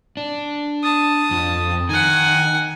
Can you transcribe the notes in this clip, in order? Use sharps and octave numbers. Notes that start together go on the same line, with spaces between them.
D4
A5 D#6
F2
D#3 F#5 G#5